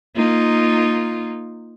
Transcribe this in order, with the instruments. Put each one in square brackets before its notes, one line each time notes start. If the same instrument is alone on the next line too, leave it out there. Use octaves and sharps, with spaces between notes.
[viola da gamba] A#3 D#4 F4